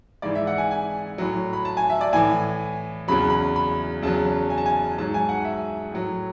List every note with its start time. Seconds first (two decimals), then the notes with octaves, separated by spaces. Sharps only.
0.22 G#2 E3 D5
0.35 E5
0.47 F#5
0.58 G#5
0.71 G#5
1.18 A2 F#3
1.53 B5
1.65 A5
1.77 G#5
1.90 E5
2.01 D5
2.13 A2 E3 G#5
3.08 E2 C#3 F#3 B5
3.30 B5
3.56 B5
4.02 E2 C#3 F#3 A5
4.50 G#5
4.58 A5
4.66 G#5
4.98 G#2 F#3 A5
5.14 G#5
5.29 F#5
5.45 E5
5.92 A2 F#3